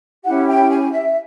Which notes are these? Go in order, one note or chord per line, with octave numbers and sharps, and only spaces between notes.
C#4 E4 G4 F#5
G5
G#5
E5